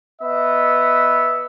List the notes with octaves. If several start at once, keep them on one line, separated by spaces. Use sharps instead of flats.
B3 D#5 E5